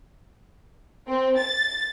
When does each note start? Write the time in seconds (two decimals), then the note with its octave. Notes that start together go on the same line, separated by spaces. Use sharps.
1.08 C4
1.37 A6